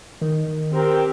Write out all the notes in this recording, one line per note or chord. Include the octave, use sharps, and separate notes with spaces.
D#3
C4 G4 A#4